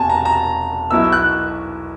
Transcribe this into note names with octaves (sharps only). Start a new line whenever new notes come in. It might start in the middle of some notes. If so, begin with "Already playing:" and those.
Already playing: E1 E2 C3 G#5 A5
A#5
A#5
B1 B2 F#3 B3 E4 E6
F#6